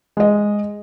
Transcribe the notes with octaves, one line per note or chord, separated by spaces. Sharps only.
G#3 D#5